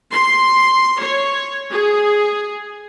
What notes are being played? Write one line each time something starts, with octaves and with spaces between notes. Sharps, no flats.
C6
C#5
G#4